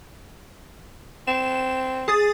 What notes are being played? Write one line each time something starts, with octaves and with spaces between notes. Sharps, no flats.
C4 E7
G#4 D#6 A6